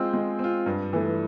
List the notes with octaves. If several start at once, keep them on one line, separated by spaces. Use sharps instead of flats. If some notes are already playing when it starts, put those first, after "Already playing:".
Already playing: G#3 C4 F4
G#3
C4 F4
G2
E3 A3